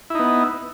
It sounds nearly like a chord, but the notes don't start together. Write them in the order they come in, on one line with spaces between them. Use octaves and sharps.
E4 D#4 B3